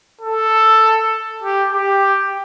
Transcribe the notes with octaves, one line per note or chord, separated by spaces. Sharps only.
A4
G4
G4